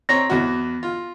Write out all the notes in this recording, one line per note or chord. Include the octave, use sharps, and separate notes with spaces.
C4 C#5 A#5 A#6
E2 F#4
F4